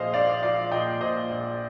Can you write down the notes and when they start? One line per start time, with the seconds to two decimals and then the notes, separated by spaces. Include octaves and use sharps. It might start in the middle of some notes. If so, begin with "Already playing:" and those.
Already playing: A#1 A#2 F3 G#4 C5 D#5 F5
0.13 A#1 D5 F5
0.43 F3 D5 F5
0.71 A#2 D#5 G5
1.01 A#2 C5 D#5
1.30 A#1